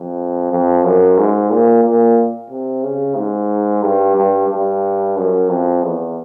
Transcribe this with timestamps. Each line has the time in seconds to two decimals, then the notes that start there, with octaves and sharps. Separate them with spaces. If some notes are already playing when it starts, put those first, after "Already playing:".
Already playing: F2
0.51 F2
0.84 F#2
1.18 G#2
1.51 A#2
1.84 A#2
2.50 C3
2.84 C#3
3.16 G#2
3.83 G2
4.17 G2
4.49 G2
5.17 F#2
5.49 F2
5.83 E2